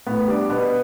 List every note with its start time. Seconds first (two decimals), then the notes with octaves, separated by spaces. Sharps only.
0.07 A2 B3 B4
0.28 G3 D4 D5
0.50 B2 B3 B4